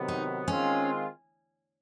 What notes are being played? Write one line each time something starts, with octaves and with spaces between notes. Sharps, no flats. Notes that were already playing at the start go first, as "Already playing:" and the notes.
Already playing: C3 D#3 F#3 B3
D#4
D#3 G#3 C4 C#4 F4